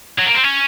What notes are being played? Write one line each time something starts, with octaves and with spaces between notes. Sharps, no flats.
F#3
A#3
C4
C#4